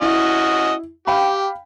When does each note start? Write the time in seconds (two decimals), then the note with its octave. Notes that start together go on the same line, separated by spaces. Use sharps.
0.02 C#4 E4 F#4 D#5
1.07 G4 F5 G5 B5